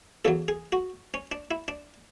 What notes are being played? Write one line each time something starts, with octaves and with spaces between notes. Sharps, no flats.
E2 C#3 F#3 A4
G#4
F#4
C#4
D4
E4
D4